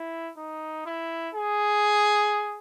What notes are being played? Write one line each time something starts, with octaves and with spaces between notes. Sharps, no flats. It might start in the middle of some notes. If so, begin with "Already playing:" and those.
Already playing: E4
D#4
E4
G#4